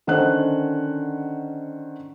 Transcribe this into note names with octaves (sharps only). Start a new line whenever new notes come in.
D3 D#3 C#4 C5 F#5 F#6